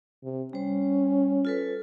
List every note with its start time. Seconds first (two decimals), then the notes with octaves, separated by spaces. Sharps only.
0.24 C3
0.53 G3 C#4 C5
1.45 F4 A4 B4